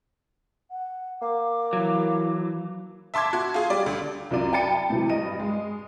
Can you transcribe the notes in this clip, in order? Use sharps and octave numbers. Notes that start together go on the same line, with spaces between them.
F#5
A#3 D6
E3 F#3
E5 A5 C6 D6 G#6
F#4
F4 G#4
G3 D5
D2
C2 F#2 F#3 F4 D5 D#7
G5 A5 B5 A6 C#7 D#7
A2 C3 E3 F#3
G2 D#5 D#7
G#3